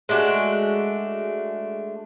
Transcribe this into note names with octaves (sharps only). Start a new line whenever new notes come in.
G#3 A3 D4 F#4